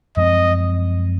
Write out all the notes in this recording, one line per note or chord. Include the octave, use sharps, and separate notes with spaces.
F#2 F3 G#3 C4 D#5